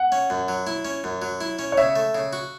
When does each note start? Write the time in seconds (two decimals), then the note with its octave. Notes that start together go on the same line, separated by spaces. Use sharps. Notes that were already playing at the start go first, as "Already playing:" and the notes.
Already playing: F#5
0.12 C#4
0.30 F#2
0.48 F#3
0.67 E4
0.85 C#4
1.04 F#2
1.22 F#3
1.41 E4
1.59 C#4
1.72 C#5
1.78 C#3 E5
1.96 A3
2.15 C#3
2.33 F#4